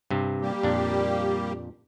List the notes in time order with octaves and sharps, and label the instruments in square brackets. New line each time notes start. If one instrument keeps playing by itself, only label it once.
[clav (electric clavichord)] G2 C3
[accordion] G3 A#3 G4
[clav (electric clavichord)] F2 A#2 D4